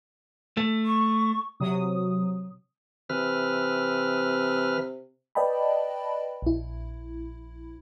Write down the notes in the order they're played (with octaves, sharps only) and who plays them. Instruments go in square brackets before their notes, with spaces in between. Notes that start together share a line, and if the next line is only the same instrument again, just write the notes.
[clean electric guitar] A3
[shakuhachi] C#6
[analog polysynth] C3 F#3 D#6
[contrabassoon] C3 [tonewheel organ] E3 B4 F6
[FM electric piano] B4 D5 D#5 G5 A5 B5
A#1 E4